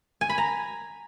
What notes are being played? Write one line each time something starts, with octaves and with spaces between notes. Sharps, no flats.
G#5
B5
A#5